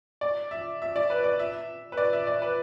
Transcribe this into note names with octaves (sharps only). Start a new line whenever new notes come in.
D5
E5
E5
D5
B4
D5
E5
B4
D5
E5
D5
B4